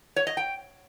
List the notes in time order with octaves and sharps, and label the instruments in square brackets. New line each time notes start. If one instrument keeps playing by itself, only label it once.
[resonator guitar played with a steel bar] C#5
D#5
G5